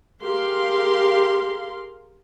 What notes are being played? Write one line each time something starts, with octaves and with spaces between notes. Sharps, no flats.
G4 G#4 A#4 F5 C6